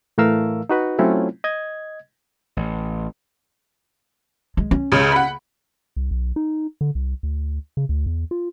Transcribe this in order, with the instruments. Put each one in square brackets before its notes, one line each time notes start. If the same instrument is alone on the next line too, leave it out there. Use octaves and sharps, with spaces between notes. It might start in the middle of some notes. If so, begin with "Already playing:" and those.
[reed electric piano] A2 E3 A3 A#4 F5 E6
D#4 F#4 B4
F#3 A3 C4 C#4 E4 F4
D#5 G#6
[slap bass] A1
[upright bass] G#3
C#4
[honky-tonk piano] C#2 C#3
F#5 B5
[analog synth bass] C2
B1
D#4
D3
C2
D2
C#3
D2
E2
F4